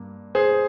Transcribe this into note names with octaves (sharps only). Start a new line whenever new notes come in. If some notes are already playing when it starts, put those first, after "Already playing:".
Already playing: G2 A#3
G#4 C5